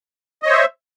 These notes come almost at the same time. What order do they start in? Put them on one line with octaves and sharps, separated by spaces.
D#5 C#5 C5 E5